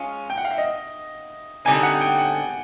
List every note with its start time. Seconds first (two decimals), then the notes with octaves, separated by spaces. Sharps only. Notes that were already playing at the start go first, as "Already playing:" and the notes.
Already playing: G#3 C#4 F4
0.30 G5
0.38 F#5
0.45 F5
0.51 E5
0.58 D#5
1.65 D3 G3 C4 D#4 G#5
1.83 F#5
2.01 G5
2.18 F#5